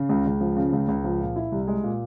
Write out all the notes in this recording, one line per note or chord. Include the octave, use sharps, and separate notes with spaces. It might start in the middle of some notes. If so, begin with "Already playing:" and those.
Already playing: C#3
C#2
C#2
F3
C#3
C#2
C#2
F3
A#2
E4
C2
G#3
A#2